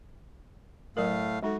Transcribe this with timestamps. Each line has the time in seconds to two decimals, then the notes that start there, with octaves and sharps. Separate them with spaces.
0.97 A2 F#3 A3 A#4 F5
1.43 G#3 D#4 F#4 A4